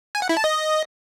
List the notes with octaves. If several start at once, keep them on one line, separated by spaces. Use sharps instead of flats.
G#5
F#5
E4
A5
D#5